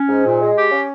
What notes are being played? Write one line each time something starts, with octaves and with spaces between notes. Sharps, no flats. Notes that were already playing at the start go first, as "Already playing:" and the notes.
Already playing: C#4
G#2
A#2
G#3
G4
C#4